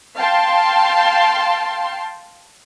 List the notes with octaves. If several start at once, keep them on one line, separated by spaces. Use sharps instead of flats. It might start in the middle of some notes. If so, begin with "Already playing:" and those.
F5 G5 A5 C6